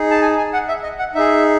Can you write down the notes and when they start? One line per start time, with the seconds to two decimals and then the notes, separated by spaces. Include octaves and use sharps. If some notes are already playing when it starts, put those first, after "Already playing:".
Already playing: D#4 G#4
0.11 A5
0.22 G#5
0.37 G#5
0.53 F#5
0.68 E5
0.83 D#5
0.99 F#5
1.15 D#4 G#4 E5